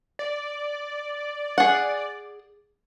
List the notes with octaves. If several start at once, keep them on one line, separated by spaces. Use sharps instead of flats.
D5
G#4 F#5